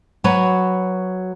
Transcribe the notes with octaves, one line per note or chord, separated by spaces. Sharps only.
F#3 F#4 B4 C#5